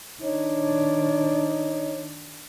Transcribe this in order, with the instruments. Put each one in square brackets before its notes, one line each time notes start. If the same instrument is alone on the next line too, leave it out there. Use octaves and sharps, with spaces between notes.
[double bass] D#3 D4 [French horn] D#4 [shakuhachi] C#5